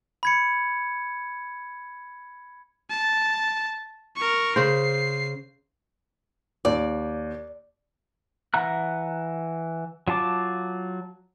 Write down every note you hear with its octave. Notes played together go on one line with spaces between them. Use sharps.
B5 G#6 C#7
A5
A#4 C#6
C#3 C5 C7
D#2 D5
E3 E5 F#5 A#5 F#6
F#3 F4 A5 D6